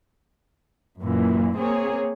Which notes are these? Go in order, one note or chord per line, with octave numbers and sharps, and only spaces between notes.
F#2 A#2 E3
A#3 C4 G#4 C#5